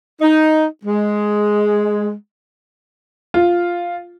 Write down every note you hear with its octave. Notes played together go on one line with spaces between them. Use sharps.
D#4
G#3
F4